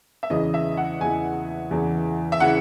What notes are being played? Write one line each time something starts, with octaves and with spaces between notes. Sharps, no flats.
E5
E2 C#3 E3 D#5
E5
F#5
E2 C#3 E3 G#5
E2 C#3 E3
E5
C#3 E3 F#5